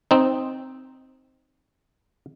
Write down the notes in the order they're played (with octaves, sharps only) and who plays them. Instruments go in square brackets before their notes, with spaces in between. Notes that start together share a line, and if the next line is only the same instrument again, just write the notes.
[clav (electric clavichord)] C4 D#4